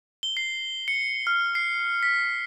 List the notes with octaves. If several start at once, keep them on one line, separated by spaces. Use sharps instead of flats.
G7
C7
C#7
F6
C7
B6